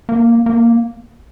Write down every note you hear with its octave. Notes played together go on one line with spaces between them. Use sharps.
A#3
A#3